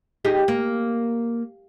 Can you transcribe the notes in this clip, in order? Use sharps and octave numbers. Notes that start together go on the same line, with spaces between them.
D#4 G4 G#4
A#3